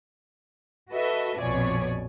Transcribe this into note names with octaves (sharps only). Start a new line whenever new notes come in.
F#4 A4 B4 D#5 E5
A#1 F2 B2 C#5 D5 G#5